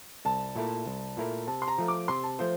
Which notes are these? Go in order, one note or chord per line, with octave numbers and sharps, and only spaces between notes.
C2 A5
A#2 A3 E4 A#4
C2
A#2 A3 E4 A#4
C3 A5
C6
A#5
F3 A3
D6
C3 C6
A5
F3 A3 C5